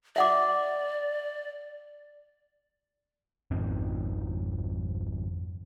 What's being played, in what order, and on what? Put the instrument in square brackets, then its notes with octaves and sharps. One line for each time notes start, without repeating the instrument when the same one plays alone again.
[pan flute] D5 [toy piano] E5 F#5 D6
[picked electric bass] G#1 F2 D#3 C4